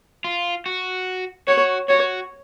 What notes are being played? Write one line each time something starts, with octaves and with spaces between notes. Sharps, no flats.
F4
F#4
F#4 C#5
F#4 C#5